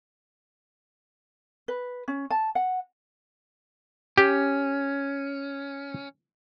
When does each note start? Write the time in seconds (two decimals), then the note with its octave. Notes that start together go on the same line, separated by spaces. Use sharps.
1.68 B4
2.08 C#4
2.30 A5
2.55 F#5
4.18 C#4 G4